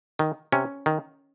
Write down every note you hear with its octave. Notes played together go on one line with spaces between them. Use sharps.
D#3
C3 C#4
D#3